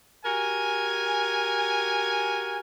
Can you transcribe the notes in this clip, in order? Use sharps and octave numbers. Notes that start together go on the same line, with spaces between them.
F#4 G4 A#4 G#5